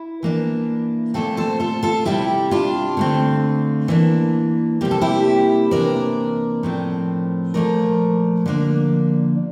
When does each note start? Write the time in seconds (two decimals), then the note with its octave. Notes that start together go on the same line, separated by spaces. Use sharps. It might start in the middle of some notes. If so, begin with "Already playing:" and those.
Already playing: E4
0.23 E3 A#3 D4
1.14 A#2 A3 C4 F4 A4
1.37 A4 C5
1.60 F4 A4
1.83 F4 A4
2.05 C3 G3 C4 E4 G4
2.51 D4 F4
2.97 D3 A3 C4
3.88 E3 A#3 D4
4.81 C3 G3 A#3 G4
4.91 A4
5.01 E4 G4
5.71 C3 E3 A#3 D4 A#4 D5
6.63 A2 F3 C4
7.54 A#2 F3 A3 A#4 D5
8.46 D3 F3 A#3 D4